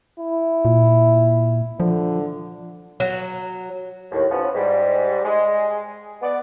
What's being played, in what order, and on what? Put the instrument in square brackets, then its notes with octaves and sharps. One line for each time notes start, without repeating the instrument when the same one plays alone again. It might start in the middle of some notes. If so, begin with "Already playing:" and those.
[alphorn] E4
[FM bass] A#2
[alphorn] D3 [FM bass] F3
[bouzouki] F#3
[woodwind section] D#2 A2
F3 B3 C#4
G#2 G3
G#3
B3 D5